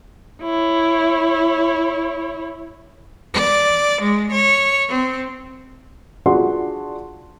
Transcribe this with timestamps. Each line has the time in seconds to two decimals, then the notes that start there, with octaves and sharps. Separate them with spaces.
0.43 E4 C#5
3.34 D5
4.02 G#3
4.32 C#5
4.89 C4
6.26 D4 F4 F#4 G#4 F#5 C6